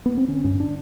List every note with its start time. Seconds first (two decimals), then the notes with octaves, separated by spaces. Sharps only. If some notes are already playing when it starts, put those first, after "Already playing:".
0.06 B3
0.17 C4
0.28 D3 C#4
0.44 G2 C#4
0.60 D4